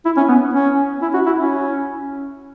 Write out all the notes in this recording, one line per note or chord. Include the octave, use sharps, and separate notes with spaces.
E4
C#4
B3
C#4
E4
F#4
E4
C#4